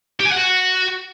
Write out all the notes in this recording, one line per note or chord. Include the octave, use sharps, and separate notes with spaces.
G4
G#5
F#5
F#4